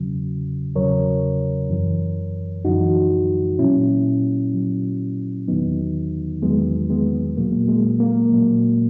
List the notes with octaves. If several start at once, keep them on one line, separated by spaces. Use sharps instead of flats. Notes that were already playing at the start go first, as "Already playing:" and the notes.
Already playing: E2 C#3 F#3
E2 C#3 F#3 A#4 C#5
F#2 E3
F#2 E3 D#4 F#4
A#2 F#3 C#4 E4
A#2 F#3
E2 D#3 F#3 B3 D#4
E2 D#3 F#3 G#3 B3
G#3 B3
A#2 F#3 A#3
G#3
A#3
A#2 F#3